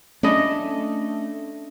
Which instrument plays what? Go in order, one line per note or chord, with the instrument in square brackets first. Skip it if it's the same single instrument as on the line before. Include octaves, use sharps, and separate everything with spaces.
[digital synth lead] A3 [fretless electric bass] C#4 [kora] D4 E4 D#5